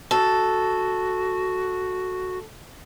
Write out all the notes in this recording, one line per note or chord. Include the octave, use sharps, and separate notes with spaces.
F#4 A4